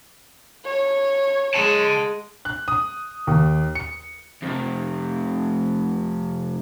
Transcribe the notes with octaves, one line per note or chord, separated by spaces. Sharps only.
C#5
G#3 F#5 A5
F#6
D#6
D#2
C#7
F2 C3